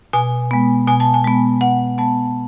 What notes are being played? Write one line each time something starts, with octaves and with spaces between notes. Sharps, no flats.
B2 G#5
G#3 B3
B2 G#5
A5
G#5
G#3 B3
B2 F#5
G#3 B3 A5